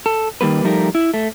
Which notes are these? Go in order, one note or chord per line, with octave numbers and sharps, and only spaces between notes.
A4
D#3 G3 A#3 B4
F3 G3 A3 D#4 G4 A#4
E4
A3